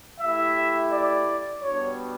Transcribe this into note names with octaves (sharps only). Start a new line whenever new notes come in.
A3 E4 G4 E5
D5
G3 B3 D4 F#4 C#5